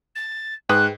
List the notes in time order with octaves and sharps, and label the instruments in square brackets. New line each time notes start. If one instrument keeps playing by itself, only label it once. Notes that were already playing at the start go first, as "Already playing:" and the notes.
[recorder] A6
[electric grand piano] G#2 [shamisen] G#4 B4 G5 [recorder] F#6